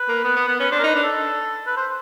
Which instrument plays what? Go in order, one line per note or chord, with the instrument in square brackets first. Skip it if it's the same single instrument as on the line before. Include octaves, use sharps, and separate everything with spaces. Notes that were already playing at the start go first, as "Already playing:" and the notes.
Already playing: [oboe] B4
[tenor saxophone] A#3
B3
B3
B3
[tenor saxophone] C#4 [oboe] B4
[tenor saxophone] D4 [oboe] C5
[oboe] A#4
[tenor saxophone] D#4 [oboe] B4
[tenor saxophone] D4
[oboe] A4
B4
C5